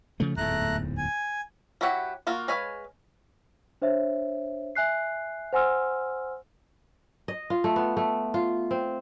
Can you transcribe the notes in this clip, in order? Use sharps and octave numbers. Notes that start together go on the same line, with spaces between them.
C#3 F3 A3
D1 E2 G#2 A3 A#5 F#6
G#5
F#3 E4 F#4 G4 F#5
A#3 F4 F#4
G#3 B4 C#5 F5 G#5
D4 C5 C#5 E5
E5 G#5 F#6 C7
C5 F#5 G#5 C6 E6 F6
D#5
F4
A3
B3
A3
F4
C4